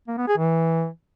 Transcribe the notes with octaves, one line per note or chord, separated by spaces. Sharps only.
A#3
B3
G#4
E3